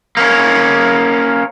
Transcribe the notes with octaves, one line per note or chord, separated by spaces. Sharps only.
A#3 C#4